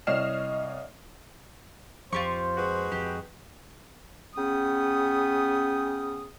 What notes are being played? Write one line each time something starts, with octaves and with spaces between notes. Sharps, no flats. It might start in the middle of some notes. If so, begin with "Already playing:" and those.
C2 C#5 D#5 F6 C7 E7
F2 F4 G4 C5 C#6
G#3 F#4 B4
F2 G4
C#3 B3 C#4 G5 D#6